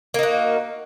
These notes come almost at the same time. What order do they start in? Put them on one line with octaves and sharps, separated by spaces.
A#3 D#4 F#4